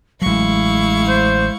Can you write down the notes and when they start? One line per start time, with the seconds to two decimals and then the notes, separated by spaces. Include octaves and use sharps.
0.22 A1 F#3 G#3 E4 F5 C#6
1.08 C5